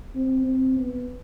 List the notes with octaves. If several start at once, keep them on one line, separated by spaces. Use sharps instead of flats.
C4
C4
B3